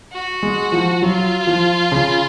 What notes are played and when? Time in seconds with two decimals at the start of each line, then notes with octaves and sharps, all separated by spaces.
0.12 F#4
0.43 G#3
0.72 F3
1.02 F#3 F4
1.47 F3
1.92 C#3